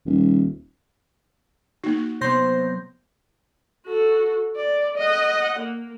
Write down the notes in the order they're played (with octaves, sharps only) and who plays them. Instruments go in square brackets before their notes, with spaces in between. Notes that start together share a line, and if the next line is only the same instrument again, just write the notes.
[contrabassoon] D#1
[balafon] A#3 D#4 [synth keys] F#4
[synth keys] C3 F#3 B3 [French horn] C5 [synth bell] C6 G6 A#6
[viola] F#4 A4
D5
D#5 F#5
A#3